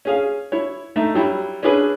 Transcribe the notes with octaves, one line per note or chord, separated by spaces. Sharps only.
C#4 G#4 F5
E4 C#5
A3 D#4 E5
F#3 G3 E4
C#4 D4 E4 G#4 B4